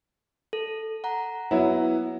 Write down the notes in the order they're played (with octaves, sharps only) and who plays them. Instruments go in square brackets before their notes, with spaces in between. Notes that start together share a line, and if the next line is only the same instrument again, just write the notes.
[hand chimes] A4
F#5 A#5
[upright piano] F#3 B3 E4